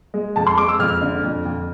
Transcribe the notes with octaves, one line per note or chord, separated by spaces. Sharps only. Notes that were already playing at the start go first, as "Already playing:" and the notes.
G#3
F2 A5
C6
G#3 D6
E6
F2 F6
D3
F2
F2